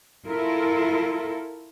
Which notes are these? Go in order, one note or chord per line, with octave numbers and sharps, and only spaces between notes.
E4 F4 A4 A#4